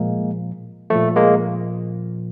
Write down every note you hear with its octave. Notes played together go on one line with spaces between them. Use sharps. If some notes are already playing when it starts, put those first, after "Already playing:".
Already playing: A#2 F3 G#3 A#3
A#2 F3 A3
G#3 A#3